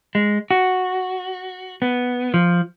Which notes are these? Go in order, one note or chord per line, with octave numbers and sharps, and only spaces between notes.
G#3
F#4
B3
F3